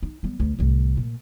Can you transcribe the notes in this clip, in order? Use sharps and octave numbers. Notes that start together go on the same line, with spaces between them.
D#4
G3 B3
D2
C2 A2
A#2